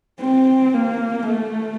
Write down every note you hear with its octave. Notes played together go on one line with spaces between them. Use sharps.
C4
A#3
A3